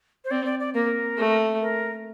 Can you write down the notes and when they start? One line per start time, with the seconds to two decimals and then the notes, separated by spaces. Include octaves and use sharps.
0.25 C5
0.31 C4 D5
0.45 D5
0.60 D5
0.74 A#3 A#4
1.18 A3
1.61 A#4